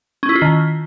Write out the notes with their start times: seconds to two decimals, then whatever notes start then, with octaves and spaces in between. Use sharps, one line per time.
0.23 C#4
0.29 E4
0.35 F4
0.42 D#3